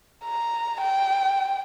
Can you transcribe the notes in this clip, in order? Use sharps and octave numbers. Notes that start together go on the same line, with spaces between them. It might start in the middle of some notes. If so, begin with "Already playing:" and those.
A#5
G5